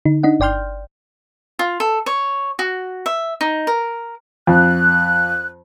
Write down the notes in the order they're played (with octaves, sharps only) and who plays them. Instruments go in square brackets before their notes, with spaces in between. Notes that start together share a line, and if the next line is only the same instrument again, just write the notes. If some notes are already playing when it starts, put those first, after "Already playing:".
[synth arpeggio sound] D3 D#4
D4 D#4 D#5 F#5
G1 D5 G5 C6 F6 G6
[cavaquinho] F4
A4
C#5
F#4
E5
D#4
A#4
[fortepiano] F2 [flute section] F#6